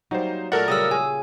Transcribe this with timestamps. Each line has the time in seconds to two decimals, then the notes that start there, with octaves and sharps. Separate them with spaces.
0.11 F#3 G3 A#3 D#4 C5
0.52 A#2 A3 A4 A#4 D5 F#5
0.68 C#3 F#3 G3 D#6 E6
0.91 C#4 G#4 G#5